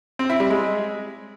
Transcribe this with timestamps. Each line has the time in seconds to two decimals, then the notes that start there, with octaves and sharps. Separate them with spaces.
0.19 C4
0.30 E4
0.40 G3
0.50 G#3